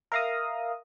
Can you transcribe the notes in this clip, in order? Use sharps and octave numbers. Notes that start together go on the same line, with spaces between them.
A#4 E5 F5 A#5 D#6